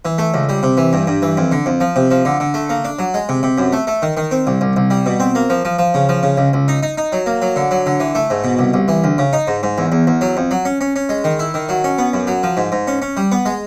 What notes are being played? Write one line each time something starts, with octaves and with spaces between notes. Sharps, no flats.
E3
A3
C#2
G3
C3
E3
G2
G2
E3
F2
D3
F2
F3
C3
F3
D3
D3
A3
A#3
D4
F#3
G#3
C3
C3
F#2
A3
A3
D#3
D#3
C4
C2
C2
C2
G3
B2
C4
A#3
F3
F3
F3
C#3
F3
C#3
C#2
C#2
D#4
D#4
D#4
F#3
A#3
F#3
D3
F#3
D3
E3
A3
G#2
B2
C2
C2
E3
D2
C#3
D#4
G#2
G#2
E2
E2
E2
F#3
F2
F#3
C#4
C#4
C#4
G#3
D#3
E4
D#3
F#3
C#4
B3
F#2
F#3
F3
G#2
G#2
C#4
C#4
G3
B3
G#3